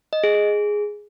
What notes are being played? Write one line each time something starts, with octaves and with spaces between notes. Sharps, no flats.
D#5
G#4
G#4